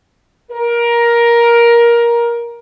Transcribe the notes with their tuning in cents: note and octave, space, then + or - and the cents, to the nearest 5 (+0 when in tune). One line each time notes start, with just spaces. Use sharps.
A#4 +15